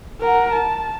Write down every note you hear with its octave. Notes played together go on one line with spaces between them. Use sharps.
A#4 F#5
A5